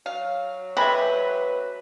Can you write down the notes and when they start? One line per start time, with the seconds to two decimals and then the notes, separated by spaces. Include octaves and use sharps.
0.06 F#3 F5
0.77 G#3 C4 G4 B4 E5 B5